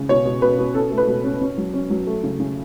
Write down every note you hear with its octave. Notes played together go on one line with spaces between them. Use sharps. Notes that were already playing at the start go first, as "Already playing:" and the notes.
Already playing: C#3
B2 C#5
B2
B2 B4
B2
C#4 A4
A3
B4
B2
C#4
C#4
F#3
C#4
F#3
A3
C#3
C#3